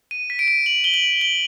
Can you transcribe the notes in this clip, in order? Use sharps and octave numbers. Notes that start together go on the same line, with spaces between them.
D#7
B6
D7
D#7
F#7
G7
F#7
G7